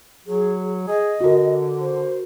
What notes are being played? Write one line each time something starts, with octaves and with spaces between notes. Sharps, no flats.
F#3 G#4
G#4 D#5
D3 F#4 A#4
C5